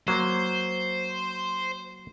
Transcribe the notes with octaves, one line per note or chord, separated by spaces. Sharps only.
F#3 A#3 C5